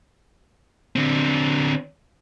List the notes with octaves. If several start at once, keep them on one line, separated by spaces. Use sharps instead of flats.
D3 C4